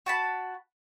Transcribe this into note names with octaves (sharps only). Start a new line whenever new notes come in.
F#4 A5 B5